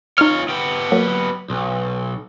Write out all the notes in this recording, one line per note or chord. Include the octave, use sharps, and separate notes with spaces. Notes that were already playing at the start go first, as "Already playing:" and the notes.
D#4 F4 C#5 F6
B3 G4
F#3 A#3
B1